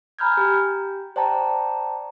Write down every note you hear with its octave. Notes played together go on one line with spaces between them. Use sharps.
G#5 A#5 B5 F6 G6 G#6
G4
C5 D5 G5 A5 A#5